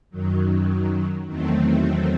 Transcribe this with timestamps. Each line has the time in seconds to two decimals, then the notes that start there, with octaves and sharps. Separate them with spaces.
0.10 F#2 D#3 F#3
1.27 E2 D#3 F#3 A3 C4